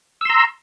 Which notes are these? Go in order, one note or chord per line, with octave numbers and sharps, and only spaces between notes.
A#5 C6 E6